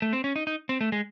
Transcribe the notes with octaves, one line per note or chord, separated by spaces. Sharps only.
A3
C4
C#4
D#4
D#4
C4
A3
G#3